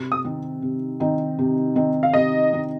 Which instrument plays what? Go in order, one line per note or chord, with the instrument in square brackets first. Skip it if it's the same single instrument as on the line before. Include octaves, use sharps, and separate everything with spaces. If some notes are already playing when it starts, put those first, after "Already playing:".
Already playing: [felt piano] C3
[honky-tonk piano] D#6
[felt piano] D#3 C4 D#4
C3
D#3 C4 D#4
C3
D#3 C4 D#4
[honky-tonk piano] F5
[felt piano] C3 [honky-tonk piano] D#5
[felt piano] D#3 C4 D#4